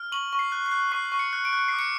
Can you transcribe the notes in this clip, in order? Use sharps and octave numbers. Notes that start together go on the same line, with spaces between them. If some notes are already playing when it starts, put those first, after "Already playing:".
Already playing: F6
C#6 F#7
C#6
C7
F#6
C7
F#6
C#6 C7
C#6
C#7
F#6
D7
F#6 C#7
D6 C7
C#7